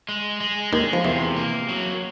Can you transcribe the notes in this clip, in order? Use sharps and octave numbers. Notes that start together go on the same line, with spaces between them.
G#3
G#3
D#2 D#3 G#3
F3
E2 C3 E3
A#3
F#3